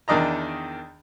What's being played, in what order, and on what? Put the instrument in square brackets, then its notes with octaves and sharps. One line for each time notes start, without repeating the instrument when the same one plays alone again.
[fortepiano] E2 D#3 D4 D#5 A#5